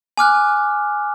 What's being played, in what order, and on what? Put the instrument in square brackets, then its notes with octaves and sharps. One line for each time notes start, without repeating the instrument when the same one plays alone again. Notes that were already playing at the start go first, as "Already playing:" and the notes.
[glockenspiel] G#5 D6 F6 F#6